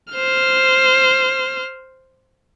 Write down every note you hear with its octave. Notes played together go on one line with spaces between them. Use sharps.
C5 F6